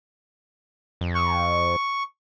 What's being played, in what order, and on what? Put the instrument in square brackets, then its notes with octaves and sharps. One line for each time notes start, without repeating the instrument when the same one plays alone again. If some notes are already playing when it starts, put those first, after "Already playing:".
[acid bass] F2
[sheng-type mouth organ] C#6